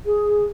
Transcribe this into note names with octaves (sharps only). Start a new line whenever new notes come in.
G#4